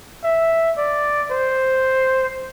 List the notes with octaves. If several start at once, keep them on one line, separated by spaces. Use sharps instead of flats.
E5
D5
C5